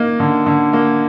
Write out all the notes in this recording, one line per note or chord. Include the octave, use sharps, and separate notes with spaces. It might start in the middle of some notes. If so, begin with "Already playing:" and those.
Already playing: A#3 D#4 D#5
D3
D3
A#3